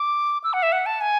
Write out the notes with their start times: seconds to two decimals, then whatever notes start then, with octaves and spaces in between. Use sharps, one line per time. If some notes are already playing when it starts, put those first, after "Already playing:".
Already playing: D6
0.44 E6
0.53 F#5
0.63 E5
0.72 F#5
0.86 A5
1.01 G#5